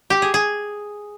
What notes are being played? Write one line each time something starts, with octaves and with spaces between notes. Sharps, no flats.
G4
G#4
G#4